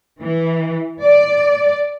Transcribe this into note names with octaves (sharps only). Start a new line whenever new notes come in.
E3
D5